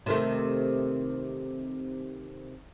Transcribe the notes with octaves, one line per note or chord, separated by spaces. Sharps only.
C3 D#3 A3